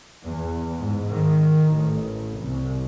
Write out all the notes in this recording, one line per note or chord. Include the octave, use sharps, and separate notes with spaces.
E2
G#2
D#3
A1
C2